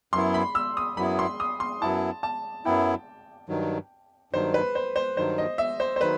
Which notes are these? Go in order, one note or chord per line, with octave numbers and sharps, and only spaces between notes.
F#2 F#3 B3 E4 C6
B5
E6
D#6
F#2 F#3 B3 E4 B5
C6
D#6
C6
F#2 F#3 B3 E4 A5
A5
F#2 F#3 B3 E4 G5
G2 D#3 F#3
G2 D#3 F#3 C5
B4
C5
C5
G2 D#3 F#3 C5
D#5
E5
C5
C5
D#3 F#3 B4